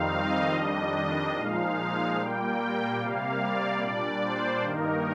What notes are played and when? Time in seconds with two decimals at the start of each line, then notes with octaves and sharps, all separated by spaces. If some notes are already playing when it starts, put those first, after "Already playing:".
Already playing: F2 D#3 G3 C4 D#4 F5
0.13 D#5
0.54 F2 D#3 G3 D4 D#5
1.36 A#2 F3 G#3 D#4 F5
2.17 A#2 G3 A#3 G5
2.99 C3 G3 A#3 F5
3.41 D5
3.81 A#2 G3 D4 D5
4.22 C5
4.63 G2 D#3 A#3 D#4 A#4